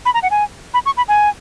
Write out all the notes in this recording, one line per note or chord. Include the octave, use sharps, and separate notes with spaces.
B5
A#5
F#5
G#5
B5
C#6
B5
G#5